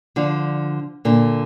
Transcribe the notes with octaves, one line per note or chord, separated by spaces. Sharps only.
D3 F3
A#2 D3